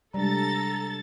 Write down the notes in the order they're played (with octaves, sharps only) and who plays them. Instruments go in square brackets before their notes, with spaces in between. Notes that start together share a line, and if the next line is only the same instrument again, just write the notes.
[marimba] C3 G#3 D4 [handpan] G3 [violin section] A4 A6 [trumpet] A#5